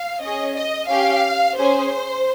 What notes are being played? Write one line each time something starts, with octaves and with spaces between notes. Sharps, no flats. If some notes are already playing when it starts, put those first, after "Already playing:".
Already playing: F5
C#4 G#4 D#5
D#5
C#4 G4 F5
C#4 G#4 C5